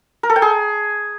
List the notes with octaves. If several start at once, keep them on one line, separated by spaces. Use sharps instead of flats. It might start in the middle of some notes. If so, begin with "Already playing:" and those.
A#4
A4
G5
G#4